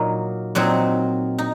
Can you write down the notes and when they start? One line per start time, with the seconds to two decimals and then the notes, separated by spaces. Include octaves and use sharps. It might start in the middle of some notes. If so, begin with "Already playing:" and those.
Already playing: A#2 F#3 A#3 D#4
0.55 A#2 F#3 C4 D#4
1.38 D#4